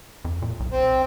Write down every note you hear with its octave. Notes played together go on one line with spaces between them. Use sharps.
F2
A#2
B1
C4